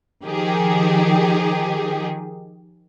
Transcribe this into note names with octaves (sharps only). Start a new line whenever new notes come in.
D#3 F3 G4 G#4